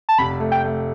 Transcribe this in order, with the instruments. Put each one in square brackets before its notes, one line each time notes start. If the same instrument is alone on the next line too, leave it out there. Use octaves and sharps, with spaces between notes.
[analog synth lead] A5
[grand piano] F1 [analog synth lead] B5
[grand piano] A3
[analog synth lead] G5
[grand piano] A3